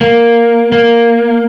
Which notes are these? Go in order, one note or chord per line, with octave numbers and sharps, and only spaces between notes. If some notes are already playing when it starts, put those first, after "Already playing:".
A#3
A#3